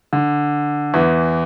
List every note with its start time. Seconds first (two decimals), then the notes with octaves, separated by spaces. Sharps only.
0.13 D3
0.94 E2 E3